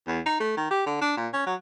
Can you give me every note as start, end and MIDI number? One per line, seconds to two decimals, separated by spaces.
0.07 0.20 40
0.26 0.37 63
0.40 0.56 57
0.57 0.69 51
0.71 0.85 67
0.86 0.97 50
1.01 1.13 62
1.17 1.28 46
1.33 1.45 61
1.46 1.55 54